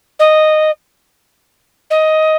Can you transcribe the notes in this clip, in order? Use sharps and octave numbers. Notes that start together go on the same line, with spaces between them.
D#5
D#5